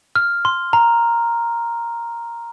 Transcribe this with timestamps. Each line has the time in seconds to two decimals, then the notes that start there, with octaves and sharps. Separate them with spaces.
0.16 F6
0.45 C6
0.73 A#5